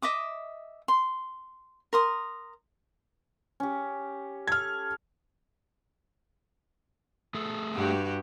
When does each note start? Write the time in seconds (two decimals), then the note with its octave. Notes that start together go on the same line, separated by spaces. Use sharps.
0.02 D#5 E5 D6 D#6
0.88 C6
1.93 A#4 C6 D#6
3.60 C#4 G4
4.47 A4 F6 G#6
7.34 A3 G#4 A4
7.75 G2 F#4 G4